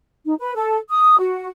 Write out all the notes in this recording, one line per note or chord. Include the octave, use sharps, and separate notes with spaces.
D#4
B4
A4
D#6
F#4